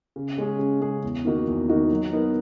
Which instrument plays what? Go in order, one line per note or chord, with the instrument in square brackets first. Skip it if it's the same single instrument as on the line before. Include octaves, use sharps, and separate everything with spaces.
[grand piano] C#3
G#3 C#4 G#4
C#3
G#3 C#4 G#4
E2
D#3 A#3 D#4 F#4
E2
D#3 A#3 D#4 F#4
F#3
B3 D#4 A#4